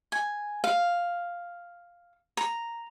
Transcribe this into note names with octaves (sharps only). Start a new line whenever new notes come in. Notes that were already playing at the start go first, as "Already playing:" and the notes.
G#5
F5
A#5